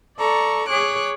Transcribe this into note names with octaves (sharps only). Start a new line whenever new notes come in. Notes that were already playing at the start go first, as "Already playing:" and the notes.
A4 D5 A#5 C#6
G#4 C#5 D6 F#6